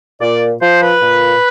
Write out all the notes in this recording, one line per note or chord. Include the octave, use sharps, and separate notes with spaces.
A#2 D5
F3 C5
B4
A#2